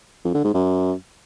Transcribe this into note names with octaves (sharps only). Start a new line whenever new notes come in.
F2
D3
G#2
F#2